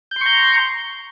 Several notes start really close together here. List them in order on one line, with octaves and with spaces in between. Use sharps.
G6 C6 C#6 A#5